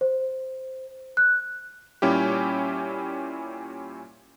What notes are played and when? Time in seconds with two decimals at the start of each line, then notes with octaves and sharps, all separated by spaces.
0.01 C5
1.17 F#6
2.02 A#2 G3 C#4 E4 G4